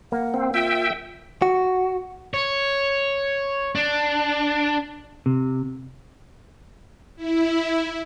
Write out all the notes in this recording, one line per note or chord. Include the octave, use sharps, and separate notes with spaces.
A#3 F#5
C4
F4 E5 G5
F#4
C#5
D4
C3
E4